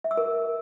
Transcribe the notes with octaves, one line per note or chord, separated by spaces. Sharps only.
E5
E6
A#4